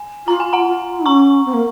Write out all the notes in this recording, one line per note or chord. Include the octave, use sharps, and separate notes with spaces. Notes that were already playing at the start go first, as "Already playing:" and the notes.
Already playing: G#5
F4 A#5
G#5
F#5 A#5
F4
C#4 A#5 C#6
C4
A#3